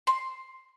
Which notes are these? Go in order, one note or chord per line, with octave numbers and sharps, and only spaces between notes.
C6